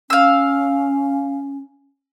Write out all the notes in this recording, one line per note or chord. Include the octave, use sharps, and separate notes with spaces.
C#4 F5 E6